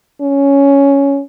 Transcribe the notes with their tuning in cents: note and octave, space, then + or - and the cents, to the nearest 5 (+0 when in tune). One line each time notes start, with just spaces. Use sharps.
C#4 +5